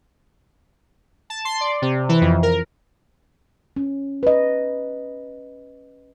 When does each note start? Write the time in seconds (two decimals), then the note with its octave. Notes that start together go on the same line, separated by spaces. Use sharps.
1.30 A5
1.45 C6
1.61 D5
1.82 C3
2.09 E3
2.21 F2
2.43 A#4
3.76 C#4
4.23 B4 D#5